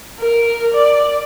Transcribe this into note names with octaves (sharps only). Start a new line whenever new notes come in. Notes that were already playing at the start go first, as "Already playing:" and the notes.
A#4
D5